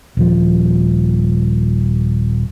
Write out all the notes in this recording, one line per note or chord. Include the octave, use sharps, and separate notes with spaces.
D#1 F3